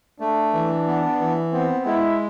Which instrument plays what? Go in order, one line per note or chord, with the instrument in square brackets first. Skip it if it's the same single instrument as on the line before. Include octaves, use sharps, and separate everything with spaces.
[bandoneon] A3 [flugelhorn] D4
[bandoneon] E3
B3
E3
[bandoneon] B3 [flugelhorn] C4
[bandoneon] G#3 [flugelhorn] E4